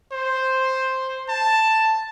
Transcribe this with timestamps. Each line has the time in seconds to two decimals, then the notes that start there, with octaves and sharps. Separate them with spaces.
0.12 C5
1.29 A5